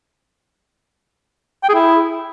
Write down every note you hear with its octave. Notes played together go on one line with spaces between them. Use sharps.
G5
G#4
E4